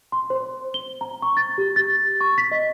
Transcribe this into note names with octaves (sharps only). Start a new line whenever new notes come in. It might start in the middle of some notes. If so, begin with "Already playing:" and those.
C6
C5
G7
A#5
C#6
A6
G4
A6
C#6
B6
D#5